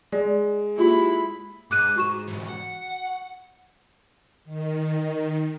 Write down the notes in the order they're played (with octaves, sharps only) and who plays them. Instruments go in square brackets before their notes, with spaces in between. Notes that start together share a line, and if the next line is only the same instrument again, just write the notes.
[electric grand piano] G#3 [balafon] D5
[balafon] A#3 F4 G4 [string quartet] E4 B5
[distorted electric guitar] G#2 [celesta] D6 F#6 D#7
[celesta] F#4 C#6 E7
[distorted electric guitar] G#2 E3
F#5
[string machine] D#3